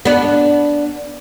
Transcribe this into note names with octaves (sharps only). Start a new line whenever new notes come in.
B3 D4